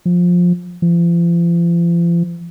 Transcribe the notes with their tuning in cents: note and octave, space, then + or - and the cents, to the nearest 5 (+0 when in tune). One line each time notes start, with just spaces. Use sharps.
F3 +15
F3 -40